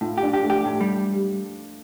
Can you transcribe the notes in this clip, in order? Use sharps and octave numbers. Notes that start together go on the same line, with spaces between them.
A2 F4
G4
D4
G4
A3
G4
A2
G3